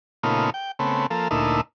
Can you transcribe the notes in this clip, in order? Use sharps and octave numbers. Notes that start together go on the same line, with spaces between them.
A#2 C#3 A3 B3 D#4 F4
G5
C#3 A3 B3 C4
F3 A#3 A4
D2 A#2 A3 D#4 E4